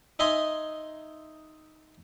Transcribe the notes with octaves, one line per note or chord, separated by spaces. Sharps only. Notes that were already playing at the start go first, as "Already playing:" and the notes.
D#4 D#5 E5 G#5 C6